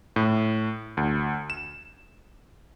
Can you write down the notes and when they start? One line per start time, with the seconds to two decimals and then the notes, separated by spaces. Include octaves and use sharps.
0.16 A2
0.97 D2
1.50 E7